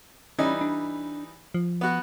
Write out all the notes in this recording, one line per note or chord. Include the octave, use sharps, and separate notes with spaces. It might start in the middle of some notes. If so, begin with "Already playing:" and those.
E3 G3 C#4 D#4
D4
F3
B3 F#4